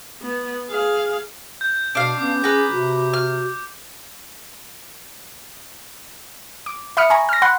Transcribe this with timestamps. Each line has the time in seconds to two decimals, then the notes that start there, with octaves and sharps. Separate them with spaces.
0.22 B3
0.70 G#4 F5
1.61 G6
1.95 B2 D4 F5
2.18 B3 C#4 D6
2.44 G#4 B4 A#5
2.72 C3 F#4
3.13 F6
6.66 D6
6.97 E5 B5 D#6 F6 C#7
7.10 G#5 A#5 B5 C#6
7.29 F6 A#6
7.42 F#5 B5 C6 F#6